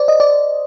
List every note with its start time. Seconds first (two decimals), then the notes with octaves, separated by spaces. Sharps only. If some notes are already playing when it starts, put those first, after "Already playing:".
Already playing: C5 D5
0.08 D#5
0.20 D5